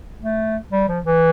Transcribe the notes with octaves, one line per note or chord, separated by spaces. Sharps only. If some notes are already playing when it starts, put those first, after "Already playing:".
A3
G3
F3
E3